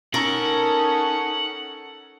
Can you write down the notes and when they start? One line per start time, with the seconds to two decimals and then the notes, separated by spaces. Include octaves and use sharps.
0.14 C#4 D#4 A4 A#4 F#5